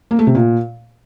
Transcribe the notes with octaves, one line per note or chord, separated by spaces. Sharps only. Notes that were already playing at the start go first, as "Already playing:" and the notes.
A#3
A3
C3
A#2